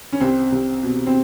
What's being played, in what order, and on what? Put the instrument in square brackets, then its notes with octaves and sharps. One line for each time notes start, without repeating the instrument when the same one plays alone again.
[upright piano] C#4
C2 C4
C2
B2
C4